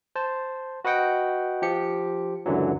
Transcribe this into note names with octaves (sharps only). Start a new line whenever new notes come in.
C5 A5
F#4 B4 D#5 F#5 G5
F3 G4 C#7
C#2 F#2 D3 E3 F#3